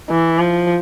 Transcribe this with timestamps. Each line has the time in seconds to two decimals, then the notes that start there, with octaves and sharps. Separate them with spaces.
0.10 E3
0.39 F3